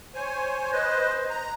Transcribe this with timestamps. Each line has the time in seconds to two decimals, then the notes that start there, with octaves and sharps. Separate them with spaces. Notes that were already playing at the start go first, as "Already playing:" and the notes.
0.15 C5 C#5 G#5
0.72 B4 C5 D#5
1.30 A#5